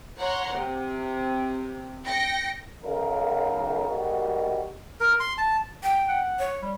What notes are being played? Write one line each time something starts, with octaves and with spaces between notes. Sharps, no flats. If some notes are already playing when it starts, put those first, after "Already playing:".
C#5 F#5 A#5 C6
C3
G5 A#6 C#7
B1 C#3 A#4
G#2 B2 D#3 G3 A3 F#4
A#4
C6
A5
G5
F#5
C#5
G3